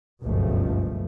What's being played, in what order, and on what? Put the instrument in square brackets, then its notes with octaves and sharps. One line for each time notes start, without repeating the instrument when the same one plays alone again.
[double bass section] F#1 C#2 G2 B2 F3 A3